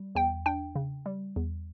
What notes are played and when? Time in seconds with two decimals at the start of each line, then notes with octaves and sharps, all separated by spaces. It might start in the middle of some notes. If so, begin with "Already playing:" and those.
Already playing: G3
0.15 E2 G5
0.46 D4 G5
0.75 C#3
1.06 G3
1.36 E2